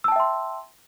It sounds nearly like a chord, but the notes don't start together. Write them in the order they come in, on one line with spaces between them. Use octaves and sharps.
E6 A5 G5 E5 C6